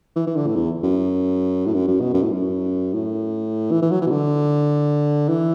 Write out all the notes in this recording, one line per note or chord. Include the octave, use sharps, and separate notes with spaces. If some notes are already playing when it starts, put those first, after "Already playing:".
E3
E3
D3
A2
E2
F#2
A2
F#2
F#2
B2
F#2
A2
F#2
A2
E3
E3
F#3
E3
B2
D3
E3